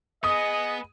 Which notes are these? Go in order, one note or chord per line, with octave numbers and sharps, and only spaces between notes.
B3 G#4 D#5 D#6